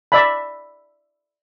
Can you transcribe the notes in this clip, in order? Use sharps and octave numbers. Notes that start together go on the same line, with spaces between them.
D5 E5 A5 B5